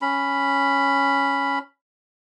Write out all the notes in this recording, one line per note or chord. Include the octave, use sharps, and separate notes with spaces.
C#4 B5